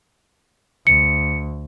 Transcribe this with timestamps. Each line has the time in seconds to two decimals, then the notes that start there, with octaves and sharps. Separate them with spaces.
0.87 D2 C#7